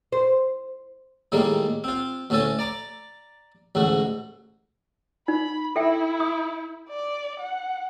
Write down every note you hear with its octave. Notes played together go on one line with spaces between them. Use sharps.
C5
A2 D#3 G3 G#3 A#3
C4 F4
D2 A2 A3 C#4 A4 G#5
D5 A#5 D6
A1 D2 G#2 F#4
D#4 B5
E4 A4 E5 G5
D#6
D5
F#5